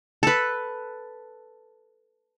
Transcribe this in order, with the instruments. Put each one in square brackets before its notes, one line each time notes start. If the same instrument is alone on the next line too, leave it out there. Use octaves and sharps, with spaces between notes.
[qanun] A4 B4